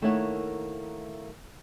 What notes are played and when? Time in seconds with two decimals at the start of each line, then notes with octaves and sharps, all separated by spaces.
0.02 D#3 A3 A#3 E4 C#5 F#5